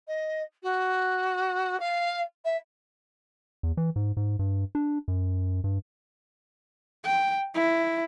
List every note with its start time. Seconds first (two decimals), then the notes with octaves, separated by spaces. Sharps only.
0.07 D#5
0.63 F#4
1.80 F5
2.45 E5
3.63 E2
3.77 E3
3.96 G#2
4.17 G#2
4.39 G2
4.75 D4
5.08 F#2
5.64 G2
7.04 G5
7.54 E4